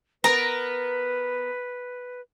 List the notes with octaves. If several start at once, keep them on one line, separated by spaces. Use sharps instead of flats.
B3 A#4 B4 A#5